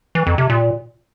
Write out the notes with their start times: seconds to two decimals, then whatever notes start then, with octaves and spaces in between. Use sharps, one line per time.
0.15 E3
0.27 F2
0.38 C3
0.50 A#2